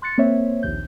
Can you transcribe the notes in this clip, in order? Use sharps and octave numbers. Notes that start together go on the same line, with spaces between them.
C6 F#6 A6 C#7
A#3 C4 C5 C#5 E5
A#1 D#2 G6